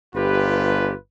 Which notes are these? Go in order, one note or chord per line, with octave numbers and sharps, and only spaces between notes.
G1 F4 G4 B4